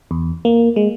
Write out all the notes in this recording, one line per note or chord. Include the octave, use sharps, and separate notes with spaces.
E2
A#3
G#3